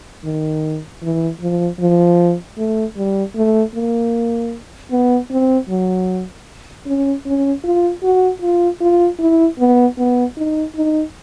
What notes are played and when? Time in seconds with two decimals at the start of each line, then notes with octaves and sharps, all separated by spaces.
0.24 D#3
1.02 E3
1.41 F3
1.80 F3
2.58 A3
2.96 G3
3.35 A3
3.75 A#3
4.91 B3
5.31 C4
5.69 F#3
6.86 C#4
7.26 C#4
7.64 F4
8.03 F#4
8.42 F4
8.81 F4
9.19 E4
9.59 B3
9.98 B3
10.37 D#4
10.75 D#4